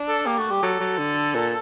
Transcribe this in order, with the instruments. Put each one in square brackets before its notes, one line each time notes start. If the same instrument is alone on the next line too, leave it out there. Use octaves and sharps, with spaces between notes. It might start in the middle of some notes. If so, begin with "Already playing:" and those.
Already playing: [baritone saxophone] D4
[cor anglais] A4
[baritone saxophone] A#3 [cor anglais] G4
[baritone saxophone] A3 [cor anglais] F#4
[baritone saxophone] G3 [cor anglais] G4
[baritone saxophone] F#3 [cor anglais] A4
[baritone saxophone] F#3
D3
A#2